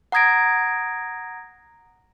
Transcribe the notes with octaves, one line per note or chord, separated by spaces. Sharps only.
F#5 A#5 D#6 G#6 A#6 D7